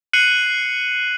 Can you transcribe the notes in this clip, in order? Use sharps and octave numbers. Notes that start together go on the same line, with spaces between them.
F#6 C7 C#7 D#7 F#7